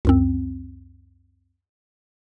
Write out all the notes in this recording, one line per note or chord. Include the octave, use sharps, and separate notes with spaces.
C#2 F#2 C4